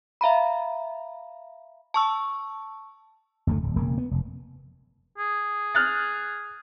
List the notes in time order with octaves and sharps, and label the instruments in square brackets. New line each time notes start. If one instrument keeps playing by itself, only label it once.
[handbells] E5 F5 A#5 B5
A5 C#6 E6
[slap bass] F#1 D2 C#3 A3
D1
E1 C#3 A#3
B3
F1
[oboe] G#4
[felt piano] F6 F#6 A6